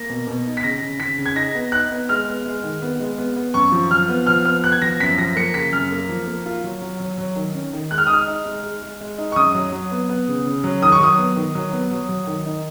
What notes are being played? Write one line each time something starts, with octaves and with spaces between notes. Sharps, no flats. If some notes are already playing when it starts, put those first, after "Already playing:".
Already playing: A#3 A#6
B2
B2
D#4
B6
C#3 A#6
C#3
C#3 B6
C#3
G#6
D#4 A#6
B3
D#4 F#6
B3
G#3 F6
B3
G#3
D#3
B3
G#3
B3
B3
F#2 C#6
F3
F3 F6
B3
F3 F6
B3 F6
B3 F#6
G#6
F3 A#6
F#2 B6
F3 A#6
A#3 C#7
C#3 B6
F#2 F6
A#3
F3
A#3
F4
F#3
F#3
F#3
F#3
D#3
C#4
D#3
G#3 F#6
F6
D#6
D#4 F6
D#4
G#3
G#3
G#3
G#3
D#4
C#6
F#2 D#6
F#3
F#3
B3
B3
C#3
C#3
F#3
D#3 D#6
C#6
F#3 D#6
B3
D#3
F#3
B3
F#3
F#3
D#3
D#4